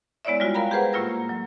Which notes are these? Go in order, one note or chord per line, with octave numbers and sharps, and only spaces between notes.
G#3 B3 E4 C#5 D5 E5
G3 G#3 F4 F#4
A#4 F5 G5 A#5 B5
G4 G#4 B4 C5 F#5
A2 A#3 F4 E6 A#6
F#3